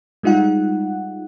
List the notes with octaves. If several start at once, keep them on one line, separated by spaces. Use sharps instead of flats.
G3 G#3 D#4 F4 F#5